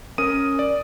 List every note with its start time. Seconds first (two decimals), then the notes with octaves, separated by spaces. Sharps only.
0.18 C#4 A#4 D#6 D#7
0.59 D5